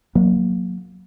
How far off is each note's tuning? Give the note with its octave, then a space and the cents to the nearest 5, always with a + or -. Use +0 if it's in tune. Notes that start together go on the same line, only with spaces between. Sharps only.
F#3 -15 A#3 +5